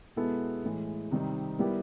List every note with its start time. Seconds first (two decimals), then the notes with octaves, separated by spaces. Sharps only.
0.16 B2 G#3 B3 E4 A4
0.64 A2 E3 G#3
1.11 C3 D#3 G3 C4 D#4
1.59 G3 B3 E4 G4 A#4